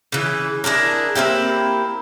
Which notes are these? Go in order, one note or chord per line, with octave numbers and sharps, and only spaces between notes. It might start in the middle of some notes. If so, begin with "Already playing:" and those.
C#3 E3
D4 E4 G#4 A#4
A#3 C4 E4 G4